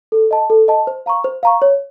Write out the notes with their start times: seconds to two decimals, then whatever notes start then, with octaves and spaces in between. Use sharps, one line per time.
0.12 A4
0.31 D#5 A5
0.50 A4
0.68 D#5 A5
0.87 C5
1.06 F5 A#5 C#6
1.24 C5
1.43 F5 A#5 C#6
1.62 C#5